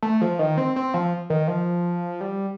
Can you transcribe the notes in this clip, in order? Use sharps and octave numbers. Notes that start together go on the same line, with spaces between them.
A3
F3
D#3
C4
C4
F3
D#3
F3
G3